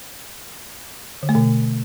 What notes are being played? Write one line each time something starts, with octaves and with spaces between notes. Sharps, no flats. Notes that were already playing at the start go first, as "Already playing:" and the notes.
D3
A3
B2